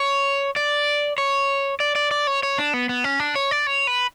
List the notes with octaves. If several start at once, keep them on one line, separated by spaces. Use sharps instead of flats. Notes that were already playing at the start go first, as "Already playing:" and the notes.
Already playing: C#5
D5
C#5
D5
D5
D5
C#5
C#5
D4
B3
B3
C#4
D4
C#5
D5
C#5
B4